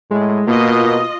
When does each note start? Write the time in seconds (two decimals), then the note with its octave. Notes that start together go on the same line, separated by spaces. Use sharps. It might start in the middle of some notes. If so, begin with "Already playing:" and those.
0.11 A2 G#3
0.47 B2 A#3 F4 D#5